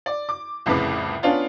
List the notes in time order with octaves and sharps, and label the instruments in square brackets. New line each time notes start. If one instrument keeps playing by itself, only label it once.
[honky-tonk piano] D5
D6
C2 F2 A2 C#3 B4 D6
B3 C#4 D4 F4 F5